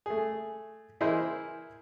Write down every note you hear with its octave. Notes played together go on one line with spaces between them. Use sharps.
A3 G#4
E3 E4 G#4 A#4 C5 D#5